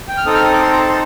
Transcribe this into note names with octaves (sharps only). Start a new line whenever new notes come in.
G5
F6
C4 D#4 A4 D#6
F6
D#6
D6
C6
A#5
A5
C6